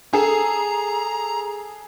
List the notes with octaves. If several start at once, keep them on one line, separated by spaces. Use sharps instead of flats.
G#4 A4 A#5